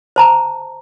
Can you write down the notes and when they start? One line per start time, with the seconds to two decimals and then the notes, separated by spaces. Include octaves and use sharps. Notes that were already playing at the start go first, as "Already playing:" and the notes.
0.16 C5 A5 A#5